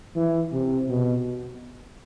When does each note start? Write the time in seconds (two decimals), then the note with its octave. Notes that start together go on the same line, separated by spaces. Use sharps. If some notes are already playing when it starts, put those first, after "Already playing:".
0.16 E3
0.53 C3
0.88 B2